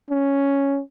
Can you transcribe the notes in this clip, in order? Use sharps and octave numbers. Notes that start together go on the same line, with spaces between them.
C#4